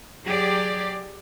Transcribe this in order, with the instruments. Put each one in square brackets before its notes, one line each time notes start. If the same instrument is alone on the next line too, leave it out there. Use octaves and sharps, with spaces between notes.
[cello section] F#3 G4 G#4 D5